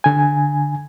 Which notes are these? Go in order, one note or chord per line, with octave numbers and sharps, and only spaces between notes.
D3 G#5